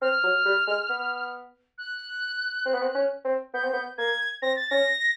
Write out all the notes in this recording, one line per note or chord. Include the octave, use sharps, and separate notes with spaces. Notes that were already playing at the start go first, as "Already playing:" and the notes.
C4 F6
F#3
G3
G#3
B3
F#6
C4
B3
C4
C#4
C4
B3 G6
C4
B3
A#3 G#6
C4 A#6
A6
C#4 A#6